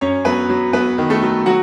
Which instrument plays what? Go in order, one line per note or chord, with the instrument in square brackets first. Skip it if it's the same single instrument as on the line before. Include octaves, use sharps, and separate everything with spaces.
[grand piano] F#2 C#4 C#5
F#3 B3 B4
F#3
F#3 B3 B4
D#3
A3 A4
F#3
F#3 F#4 F#5